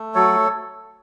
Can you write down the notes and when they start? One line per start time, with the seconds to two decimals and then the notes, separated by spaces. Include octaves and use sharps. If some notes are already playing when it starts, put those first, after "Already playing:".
Already playing: A3
0.15 F#3 A4 C#5